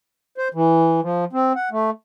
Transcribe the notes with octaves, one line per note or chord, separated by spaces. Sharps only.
C5
E3
F3
C4
F#5
A3